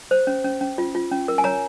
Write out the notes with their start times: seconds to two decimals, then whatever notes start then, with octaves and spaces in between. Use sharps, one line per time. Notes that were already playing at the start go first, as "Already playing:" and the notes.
0.11 C5
0.27 C#4
0.44 C#4
0.61 C#4
0.78 F4
0.95 F4
1.12 C#4
1.28 A#4
1.38 G#5
1.44 C#5 A#5